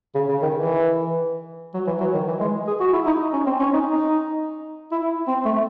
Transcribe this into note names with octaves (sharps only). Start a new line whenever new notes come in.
C#3
C#3
D#3
E3
F#3
E3
F#3
D#3
E3
G#3
G#4
F#4
E4
D#4
C#4
C4
C#4
D#4
D#4
E4
C4
A3